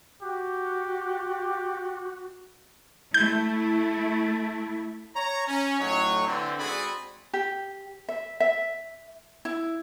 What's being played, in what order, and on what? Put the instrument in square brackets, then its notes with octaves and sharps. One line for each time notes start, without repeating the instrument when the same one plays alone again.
[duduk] F#4 [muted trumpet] G4
[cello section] A3 E4 [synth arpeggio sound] G6
[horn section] C#5 A#5
C#4
A2 F#3 D#4 C#5
D3 E3 C4
G#2 C4 F#4 G#4 D5 B5
[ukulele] G4
E5
E5
E4